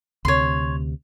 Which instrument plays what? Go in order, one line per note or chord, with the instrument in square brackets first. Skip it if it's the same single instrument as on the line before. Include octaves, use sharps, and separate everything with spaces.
[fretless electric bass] D2 C3 [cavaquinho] C#5 C6